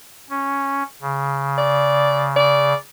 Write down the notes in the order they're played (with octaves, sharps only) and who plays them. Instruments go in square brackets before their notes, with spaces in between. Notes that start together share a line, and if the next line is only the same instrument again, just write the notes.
[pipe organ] C#4
C#3
[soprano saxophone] D5
D5